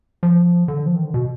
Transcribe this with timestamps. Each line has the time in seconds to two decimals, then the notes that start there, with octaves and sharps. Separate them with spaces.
0.23 F3
0.68 D3
0.86 F3
0.95 D#3
1.05 D3
1.14 B2